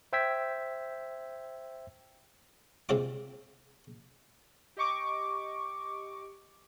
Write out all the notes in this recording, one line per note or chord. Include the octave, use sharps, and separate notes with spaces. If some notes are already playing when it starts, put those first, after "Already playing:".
C5 E5 G5 E6 G#6 B6
C3 G#3 C4 F4 D6
G4 D#5 C#6 D6